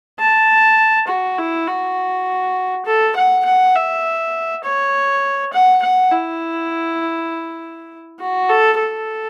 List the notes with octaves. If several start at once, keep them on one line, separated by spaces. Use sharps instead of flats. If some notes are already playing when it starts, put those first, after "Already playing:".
A5
F#4
E4
F#4
A4
F#5
F#5
E5
C#5
F#5
F#5
E4
F#4
A4
A4